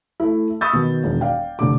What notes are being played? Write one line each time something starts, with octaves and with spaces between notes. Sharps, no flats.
A3 E4
B5 C#6 D#6 E6 G6 A6
B2 D#3
E1 D#3
D5 F5 G5
F1 D3 D6